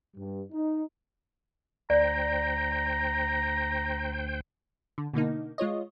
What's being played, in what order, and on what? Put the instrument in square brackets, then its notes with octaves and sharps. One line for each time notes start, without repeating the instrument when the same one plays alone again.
[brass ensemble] G2
D#4
[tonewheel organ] D2 C5 G5 [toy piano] D5 [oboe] A#5
[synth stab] D3
B2 D3 A#3 D#4
G#3 F4 C#5 D#5